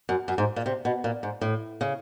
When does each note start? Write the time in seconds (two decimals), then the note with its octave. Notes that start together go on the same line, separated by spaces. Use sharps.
0.09 F#2
0.28 F#2
0.38 G#2
0.56 A#2
0.66 C3
0.85 B2
1.04 A#2
1.23 G#2
1.41 A2
1.81 C#3